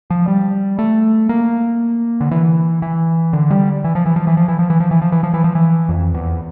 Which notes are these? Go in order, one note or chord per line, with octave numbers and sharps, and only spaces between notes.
F3
G3
A3
A#3
D3
E3
E3
D3
G3
E3
F3
E3
F3
E3
F3
E3
F3
E3
F3
E3
F3
E3
F3
E3
F3
E3
F2
E2